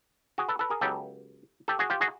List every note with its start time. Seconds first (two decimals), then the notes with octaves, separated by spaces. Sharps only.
0.38 F#4 G#4
0.49 A4 B4
0.59 A4 B4
0.70 G#4 A#4
0.81 C#2 C#3 F#3 B3 G4 A4
1.68 G4 A4
1.79 F#4 G#4
1.90 F4 G4
2.01 F#4 G#4